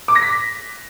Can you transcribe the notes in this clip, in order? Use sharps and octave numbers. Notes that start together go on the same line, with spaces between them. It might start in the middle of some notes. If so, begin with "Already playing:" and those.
D6
A#6
B6